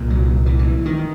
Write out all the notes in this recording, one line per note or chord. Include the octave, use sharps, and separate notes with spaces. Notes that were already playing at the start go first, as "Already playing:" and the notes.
Already playing: C2 A#2
F#3
E3
E3
D#3